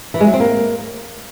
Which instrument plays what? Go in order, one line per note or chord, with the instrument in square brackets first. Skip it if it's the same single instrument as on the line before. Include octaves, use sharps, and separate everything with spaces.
[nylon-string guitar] E3
G#3
F#3
C4
A#3